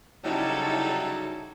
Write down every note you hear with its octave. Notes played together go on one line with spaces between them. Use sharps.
C#3 F#3 G3 D#4 E4 A4